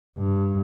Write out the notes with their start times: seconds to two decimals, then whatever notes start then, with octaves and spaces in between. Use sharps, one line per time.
0.18 G2